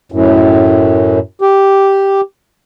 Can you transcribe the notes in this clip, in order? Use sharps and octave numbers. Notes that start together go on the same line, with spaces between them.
F#2 A2
G4